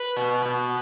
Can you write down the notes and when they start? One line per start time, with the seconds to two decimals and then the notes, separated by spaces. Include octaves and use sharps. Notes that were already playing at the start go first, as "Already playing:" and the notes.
Already playing: B4
0.16 B2
0.45 B2